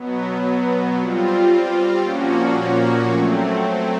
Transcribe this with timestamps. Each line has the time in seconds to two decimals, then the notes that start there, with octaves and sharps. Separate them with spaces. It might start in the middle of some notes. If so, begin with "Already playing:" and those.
Already playing: B2 F#3 B3
0.99 G3 C4 F4
2.03 A#2 F3 A#3 C#4 F#4
3.07 F#3 A3 C4